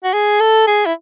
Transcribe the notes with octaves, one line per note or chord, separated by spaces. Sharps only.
F#4
G#4
A4
G#4
E4